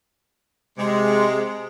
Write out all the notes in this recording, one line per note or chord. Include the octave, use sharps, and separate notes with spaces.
C3 G#3